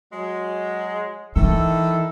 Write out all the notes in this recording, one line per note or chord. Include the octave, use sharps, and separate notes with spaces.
F#3 G#3
D#3 E3 E4 A4